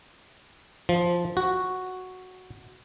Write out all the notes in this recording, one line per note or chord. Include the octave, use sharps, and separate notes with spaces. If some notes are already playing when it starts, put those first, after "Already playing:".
F3
F#4